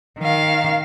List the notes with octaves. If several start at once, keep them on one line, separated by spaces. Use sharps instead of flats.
D#3 F5